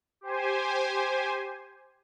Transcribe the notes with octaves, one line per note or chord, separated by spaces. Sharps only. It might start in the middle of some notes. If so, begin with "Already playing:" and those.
G4 C5 G#5